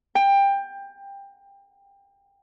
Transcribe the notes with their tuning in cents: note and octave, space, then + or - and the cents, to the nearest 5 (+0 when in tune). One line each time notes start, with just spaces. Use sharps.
G5 +20